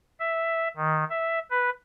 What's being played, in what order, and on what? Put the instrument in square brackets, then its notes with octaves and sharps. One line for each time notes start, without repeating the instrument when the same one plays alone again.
[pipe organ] E5
D#3
E5
B4